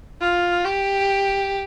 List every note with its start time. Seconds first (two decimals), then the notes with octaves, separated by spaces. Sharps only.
0.21 F4
0.65 G4